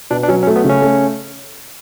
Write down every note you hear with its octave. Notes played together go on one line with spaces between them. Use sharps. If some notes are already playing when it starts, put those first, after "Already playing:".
B2 D4
D4
F#3 C#4
C#4
A3
B3
C#3 C#4
A3